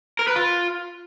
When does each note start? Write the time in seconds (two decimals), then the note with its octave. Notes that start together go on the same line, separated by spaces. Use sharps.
0.19 A#4
0.27 B4
0.36 F4